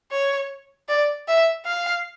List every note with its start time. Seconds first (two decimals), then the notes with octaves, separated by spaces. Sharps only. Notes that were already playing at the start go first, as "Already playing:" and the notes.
0.13 C#5
0.89 D5
1.28 E5
1.67 F5